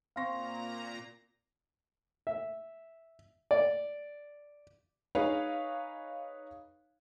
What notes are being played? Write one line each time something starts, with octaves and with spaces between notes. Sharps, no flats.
A#2 C4 F5 A#5 C6 C#6 A#6
E5
D5
D#4 G#4 B4 C#5 F5